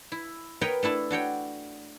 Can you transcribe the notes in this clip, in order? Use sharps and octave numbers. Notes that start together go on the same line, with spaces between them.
E4
A#4 B4 C#5 D#5 G5 A#5
A3 D4 E4 A5
D4 F#4 C#5 G5